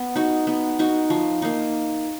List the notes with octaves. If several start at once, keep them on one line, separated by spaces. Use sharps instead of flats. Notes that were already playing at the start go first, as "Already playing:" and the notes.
Already playing: B3
D#4 F#4
B3
D#4 F#4
F3
A#3 D#4